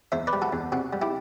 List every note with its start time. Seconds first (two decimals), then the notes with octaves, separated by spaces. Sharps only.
0.12 E2 C5 E5
0.27 B4 D5
0.33 G3
0.42 F#4 A4
0.53 E2
0.72 C3 F#4
0.93 G3
1.02 E4 G4